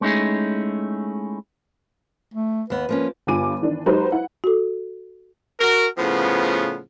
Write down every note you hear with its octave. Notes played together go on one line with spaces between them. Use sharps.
G#3 A3 C#4 D#4 E4 G#4
A3
D#2 B3 B4
F3 A#3 C#4
G1 G2 F4 G#5 D6 D#7
D#3 E3 D4
F#3 G#3 D#4 G4 B4 C5
E4 F#5
F#4 A4
F#4 A#4
A2 C#3 F3 B3